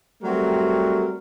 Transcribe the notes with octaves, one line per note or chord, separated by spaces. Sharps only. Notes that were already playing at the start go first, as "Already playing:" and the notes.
F#3 G3 A3 C4 F#4 A#4